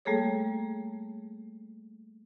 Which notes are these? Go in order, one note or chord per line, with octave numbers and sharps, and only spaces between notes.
G3 A3 A#3 G#4 A4 C#5